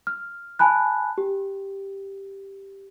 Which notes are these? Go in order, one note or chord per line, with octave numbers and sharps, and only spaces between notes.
F6
G#5 A5 B5 F#6
G4